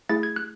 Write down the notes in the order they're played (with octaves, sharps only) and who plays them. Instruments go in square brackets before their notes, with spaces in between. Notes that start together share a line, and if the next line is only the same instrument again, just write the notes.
[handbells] A3 E4 G#4 A6
G#6
F#6